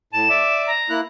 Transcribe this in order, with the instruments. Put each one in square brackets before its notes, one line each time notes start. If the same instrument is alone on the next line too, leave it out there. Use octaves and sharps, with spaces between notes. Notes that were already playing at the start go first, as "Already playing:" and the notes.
[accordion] A2 A5 [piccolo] E7
[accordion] D5 E5 D6
[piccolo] A#5
[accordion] A#3 E4 F#6